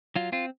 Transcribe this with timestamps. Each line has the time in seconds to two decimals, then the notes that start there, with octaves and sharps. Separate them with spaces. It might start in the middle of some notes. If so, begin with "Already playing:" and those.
0.16 F#3 F4
0.32 C4 F4